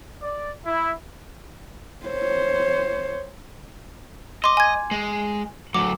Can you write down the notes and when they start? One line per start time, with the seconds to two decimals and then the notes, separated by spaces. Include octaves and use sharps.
0.22 D5
0.65 E4
2.06 C5 C#5
4.44 D#5 C6 D6
4.57 G#5 G#6
4.91 G#3
5.74 D2 F#3 D6